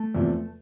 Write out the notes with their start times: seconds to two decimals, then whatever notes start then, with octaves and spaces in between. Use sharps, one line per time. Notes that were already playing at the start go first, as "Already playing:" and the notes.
Already playing: A3
0.15 E2 C3 F3